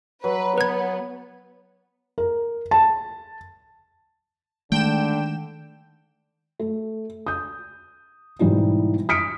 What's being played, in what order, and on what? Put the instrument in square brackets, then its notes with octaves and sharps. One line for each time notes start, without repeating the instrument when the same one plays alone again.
[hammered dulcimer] F#3 [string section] B4
[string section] B3 [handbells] B4 G#6
[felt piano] A#4
A5
[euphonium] D3 [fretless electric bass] D#3 G#3 [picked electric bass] A3 [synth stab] G5 E7
[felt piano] A3
D#6 G6
G#2 B2 E3 G3 D#4 E4
D#6 F6 B6 C#7 D7